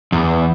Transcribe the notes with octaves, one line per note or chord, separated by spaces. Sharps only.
E2